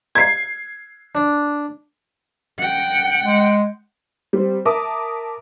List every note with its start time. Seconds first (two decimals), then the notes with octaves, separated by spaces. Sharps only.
0.15 G#6 C7
1.15 D4
2.60 F#5 G5
3.24 G#3
4.33 G3 C4
4.65 A#4 E5 A5 D6 D#6